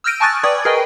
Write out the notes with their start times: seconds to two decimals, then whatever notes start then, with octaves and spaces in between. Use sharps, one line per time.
0.04 E6 F6 G6 A#6 D7 D#7
0.20 G#5 A5 C#6 D#6 F#6 A6
0.43 B4 D5 G5 C#6 D#6 G#6
0.65 G#4 A#4 B4 D#5 G5 G#5